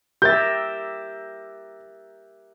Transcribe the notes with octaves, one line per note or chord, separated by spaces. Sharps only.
G4 A#4 E5 G6 A6